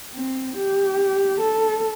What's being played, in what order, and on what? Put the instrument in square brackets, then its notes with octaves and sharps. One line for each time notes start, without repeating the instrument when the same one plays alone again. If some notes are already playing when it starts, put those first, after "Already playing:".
[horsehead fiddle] C4
G4
A4